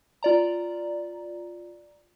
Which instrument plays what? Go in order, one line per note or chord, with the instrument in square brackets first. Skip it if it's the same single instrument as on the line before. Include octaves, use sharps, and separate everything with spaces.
[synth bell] F4 D5 A#5